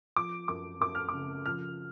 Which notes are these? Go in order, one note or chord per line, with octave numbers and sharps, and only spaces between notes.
F3 D6
F#2 D6
F#2 D6
F6
D6
C#3
F3 F6